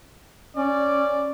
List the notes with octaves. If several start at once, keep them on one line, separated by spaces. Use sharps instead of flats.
C#4 D5